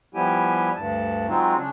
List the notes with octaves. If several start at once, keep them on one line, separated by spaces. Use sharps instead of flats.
F3 G3 B3 E4 G4 G#5
D2 G2 A5
F#3 G#3 C4 D#4 F4
C#3 D4